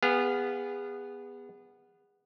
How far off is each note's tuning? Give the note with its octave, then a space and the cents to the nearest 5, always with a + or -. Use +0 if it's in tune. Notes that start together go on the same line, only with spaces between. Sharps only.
B3 +0 G#4 -30 F5 +0